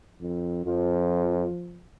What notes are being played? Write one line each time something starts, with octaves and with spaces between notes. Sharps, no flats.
F2
F2 F3